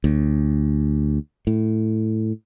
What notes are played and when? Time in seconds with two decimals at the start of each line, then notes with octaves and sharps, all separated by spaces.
0.04 D2
1.47 A2